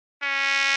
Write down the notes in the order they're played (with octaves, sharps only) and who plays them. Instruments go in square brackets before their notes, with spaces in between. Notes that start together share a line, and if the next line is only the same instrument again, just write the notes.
[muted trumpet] C#4